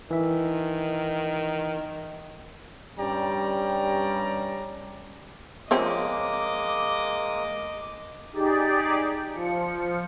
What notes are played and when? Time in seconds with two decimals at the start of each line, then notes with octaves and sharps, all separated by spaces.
0.11 D#3 E3 E5
2.99 G2 G3 C#4 D5 G5 A#5
5.71 F3 G#3 A#3 C4 C#4 D#5 D6
8.32 D#4 G4 G#4 D5
9.34 F3 C#7